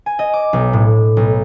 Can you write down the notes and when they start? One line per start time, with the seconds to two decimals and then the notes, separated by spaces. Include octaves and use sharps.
0.06 G#5
0.19 D#5
0.34 D6
0.53 B1
0.73 A2
1.17 B1